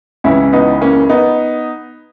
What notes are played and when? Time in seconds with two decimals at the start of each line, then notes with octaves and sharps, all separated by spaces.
0.24 C#2 C#3 E3 C#4 E4
0.52 B3 D#4
0.82 A#3 C#4
1.10 B3 D#4